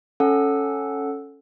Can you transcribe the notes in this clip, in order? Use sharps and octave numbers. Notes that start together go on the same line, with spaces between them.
C#4 A4 F#5